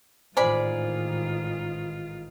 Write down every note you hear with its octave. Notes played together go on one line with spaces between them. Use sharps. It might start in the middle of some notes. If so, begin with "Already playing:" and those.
A1 G#2 D#3 F4 G#4 C5 D5 B5